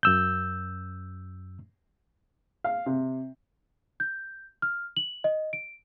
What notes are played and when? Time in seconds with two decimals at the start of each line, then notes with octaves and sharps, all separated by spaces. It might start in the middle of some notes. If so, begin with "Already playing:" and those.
0.03 F#2 E6 G6
2.64 F5
2.86 C3
4.00 G6
4.62 F6
4.96 F#7
5.24 D#5
5.53 D7